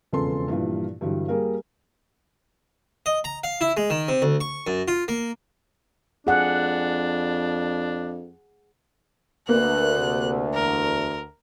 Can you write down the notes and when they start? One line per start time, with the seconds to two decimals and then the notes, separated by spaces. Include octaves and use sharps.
0.13 E1 F2 C#3 A4 B4 C6
0.48 G2 A#2 E3 F3 G3 F4
1.01 G2 D3 E3 F#3 G3
1.28 G3 A#3 G#4 A#4 F5
3.06 D#5
3.24 A#5
3.44 F5
3.61 E4
3.77 G#3
3.90 D#3
4.08 C3
4.22 D2
4.41 C#6
4.67 F#2
4.88 F4
5.08 A#3
6.27 F2 D4 G#4 F#5
9.49 D2 A#3 B4 F#6
9.98 C3
10.55 E2 A#4